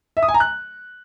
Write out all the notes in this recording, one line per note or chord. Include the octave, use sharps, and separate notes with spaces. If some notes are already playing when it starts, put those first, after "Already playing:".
E5
D#6
G#5
A#5
F#6